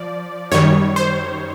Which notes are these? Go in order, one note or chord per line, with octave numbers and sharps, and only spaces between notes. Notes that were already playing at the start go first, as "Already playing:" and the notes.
Already playing: F3 D5
F#2 D#3 G3 C#5
C5